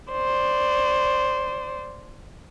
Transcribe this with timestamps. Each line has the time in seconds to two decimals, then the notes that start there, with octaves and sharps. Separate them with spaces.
0.12 C5 D5